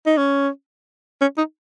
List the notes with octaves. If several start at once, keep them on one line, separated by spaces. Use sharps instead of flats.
D#4
C#4
C#4
D#4